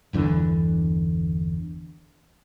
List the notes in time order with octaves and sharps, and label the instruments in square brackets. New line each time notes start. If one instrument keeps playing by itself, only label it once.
[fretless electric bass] G1 E2 D3 E3